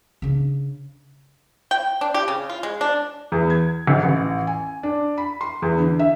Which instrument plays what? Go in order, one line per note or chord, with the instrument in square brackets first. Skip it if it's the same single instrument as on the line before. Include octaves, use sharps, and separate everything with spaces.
[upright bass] C#3 D4
[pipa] G5
D4
G4
C#3
F4
G#3
D4
[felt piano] E2
G#6
G#1
A1
G#5
D4
B5
C6
E2
D3
E5